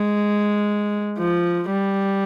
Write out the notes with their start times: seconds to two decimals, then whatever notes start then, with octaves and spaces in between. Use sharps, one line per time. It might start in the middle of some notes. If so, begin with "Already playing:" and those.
Already playing: G#3
1.18 F3
1.70 G3